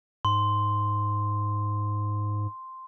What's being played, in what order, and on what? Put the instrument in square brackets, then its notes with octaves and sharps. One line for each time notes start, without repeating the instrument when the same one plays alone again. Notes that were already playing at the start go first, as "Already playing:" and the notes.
[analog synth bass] G#2 [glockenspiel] C6